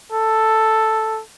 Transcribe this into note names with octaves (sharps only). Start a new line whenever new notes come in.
A4